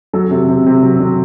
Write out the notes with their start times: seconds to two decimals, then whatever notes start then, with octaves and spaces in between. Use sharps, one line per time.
0.13 F#3 A4
0.31 C3
0.49 C3
0.67 C3
0.83 F#3
1.00 F#3